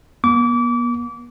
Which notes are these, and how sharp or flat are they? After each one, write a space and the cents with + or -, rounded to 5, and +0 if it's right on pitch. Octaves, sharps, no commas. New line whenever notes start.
B3 -40 D6 -30